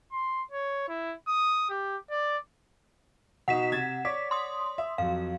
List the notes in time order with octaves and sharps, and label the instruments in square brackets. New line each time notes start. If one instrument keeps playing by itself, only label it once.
[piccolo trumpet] C6
C#5
E4
D#6
G4
D5
[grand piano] B2 D#4 [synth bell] F#5 B6 E7
[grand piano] C3 G#6 A6
[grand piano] C#5 D5 D6 [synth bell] B6
[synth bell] C6 D#6
[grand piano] E5
[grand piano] F2 F#3 [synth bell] F5